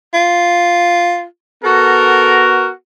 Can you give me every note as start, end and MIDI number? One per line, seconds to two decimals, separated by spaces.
0.14 1.24 65
1.63 2.69 59
1.63 2.69 66
1.63 2.53 69
1.63 2.69 70